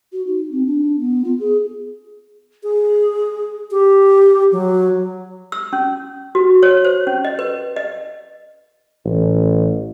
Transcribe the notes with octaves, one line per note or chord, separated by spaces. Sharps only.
F#4
D#4
C4
D4
B3
F4
G#4
G#4
G4
F#3
E6
C#4
F#4
C#5
C5
C#4
D#5
B4
D#5
A1